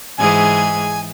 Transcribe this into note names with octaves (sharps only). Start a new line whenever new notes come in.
G#2 E3 G#4 G#5